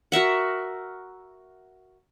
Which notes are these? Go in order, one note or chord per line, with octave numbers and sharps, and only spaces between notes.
F#4 A#4 E5 F#5